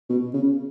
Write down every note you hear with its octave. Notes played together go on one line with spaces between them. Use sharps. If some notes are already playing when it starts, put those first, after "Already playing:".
B2
C#3